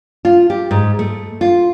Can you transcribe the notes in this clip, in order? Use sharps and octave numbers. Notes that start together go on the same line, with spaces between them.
F4
G4
G#2
A3
F4